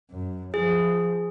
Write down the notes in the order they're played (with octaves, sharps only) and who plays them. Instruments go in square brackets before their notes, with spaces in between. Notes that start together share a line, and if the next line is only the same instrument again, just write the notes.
[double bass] F#2
[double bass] F3 [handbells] G#4